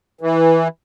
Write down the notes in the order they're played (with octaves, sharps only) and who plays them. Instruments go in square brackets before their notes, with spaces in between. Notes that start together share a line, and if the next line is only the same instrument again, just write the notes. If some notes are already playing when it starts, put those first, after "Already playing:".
[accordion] E3